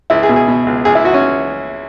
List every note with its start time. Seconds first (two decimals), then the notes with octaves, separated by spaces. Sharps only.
0.10 C#2 E4
0.23 G#4
0.29 B2
0.36 G#4
0.48 B2
0.66 C#2
0.85 C#2 G#4
0.95 E4
1.04 C#2 F#4
1.14 C#4